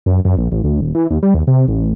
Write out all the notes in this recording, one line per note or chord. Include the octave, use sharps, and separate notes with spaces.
F#2
F#2
A#1
A1
D2
D#1
E3
D#2
G3
D#2
C3
A1